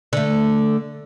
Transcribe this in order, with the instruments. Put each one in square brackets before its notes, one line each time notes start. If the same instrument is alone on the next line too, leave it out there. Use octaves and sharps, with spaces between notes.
[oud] D3 A3